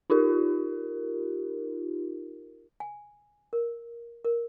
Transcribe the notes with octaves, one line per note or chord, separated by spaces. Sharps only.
D#4 F4 G4 A#4
G#5
A#4
A#4